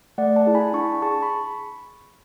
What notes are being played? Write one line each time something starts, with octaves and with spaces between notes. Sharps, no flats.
A3 D5 F#5
F#5 A5
E4 G#4
G#5 B5
D4 A5 C#6
G#4 A5 C#6
B5